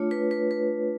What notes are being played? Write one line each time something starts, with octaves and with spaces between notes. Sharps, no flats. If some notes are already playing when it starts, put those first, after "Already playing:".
Already playing: A3 D4 F4 C#5
B4
B4
B4